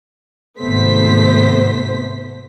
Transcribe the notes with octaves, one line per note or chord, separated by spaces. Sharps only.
G#1 C3 A3 B3 C5 B6